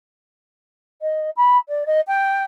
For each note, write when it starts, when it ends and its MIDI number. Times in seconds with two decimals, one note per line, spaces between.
1.01 1.30 75
1.36 1.57 83
1.69 1.84 74
1.86 2.01 75
2.07 2.44 79